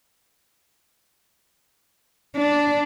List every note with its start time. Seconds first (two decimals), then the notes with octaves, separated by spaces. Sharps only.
2.36 D4